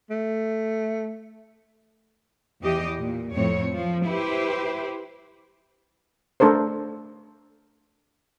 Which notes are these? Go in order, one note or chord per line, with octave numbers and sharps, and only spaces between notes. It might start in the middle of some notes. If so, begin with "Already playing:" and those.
A3
E2 E3 G4 D#5
A#2
F2 A2 C4 C#5
F3
E4 G4 B4 C5
A3 D4 A4 A#4 C5